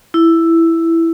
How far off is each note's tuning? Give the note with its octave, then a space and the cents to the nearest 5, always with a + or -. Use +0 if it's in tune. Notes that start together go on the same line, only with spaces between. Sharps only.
E4 +5